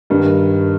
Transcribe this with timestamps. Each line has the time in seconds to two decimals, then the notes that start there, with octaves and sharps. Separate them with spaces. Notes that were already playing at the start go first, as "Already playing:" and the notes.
0.10 G2 D#3 G3